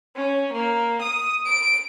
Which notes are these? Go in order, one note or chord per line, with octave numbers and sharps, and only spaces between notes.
C#4
A#3
D#6
D7